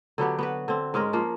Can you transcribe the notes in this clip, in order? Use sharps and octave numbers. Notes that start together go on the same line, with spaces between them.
D3 F#3 B3 G4
B3 F#4 B4
D3 C4
G#2 G#3 C#4 A#4
F3 A#3